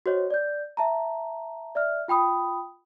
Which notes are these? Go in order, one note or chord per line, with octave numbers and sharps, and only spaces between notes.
F#4 C5 C#5 D#5
D5 G6
E5 A5 A#5
D5 E5 F6
F4 G5 B5 D#6